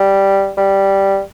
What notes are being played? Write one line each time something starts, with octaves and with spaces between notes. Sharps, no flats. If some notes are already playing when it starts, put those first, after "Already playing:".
Already playing: G3
G3